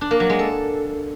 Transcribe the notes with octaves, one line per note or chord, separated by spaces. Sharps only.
D4
A#3
F#3
G#3
A4